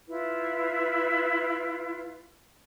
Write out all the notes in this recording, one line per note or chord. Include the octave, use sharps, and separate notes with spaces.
E4 F4 B4